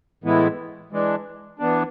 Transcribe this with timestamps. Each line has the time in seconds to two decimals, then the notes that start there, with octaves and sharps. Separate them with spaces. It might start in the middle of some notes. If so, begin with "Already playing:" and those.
0.24 A2 E3 G#3 B3 E4
0.92 E3 G#3 D4
1.59 E3 B3 D4